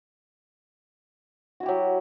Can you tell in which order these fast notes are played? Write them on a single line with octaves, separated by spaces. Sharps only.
F#4 E4 G4 F#3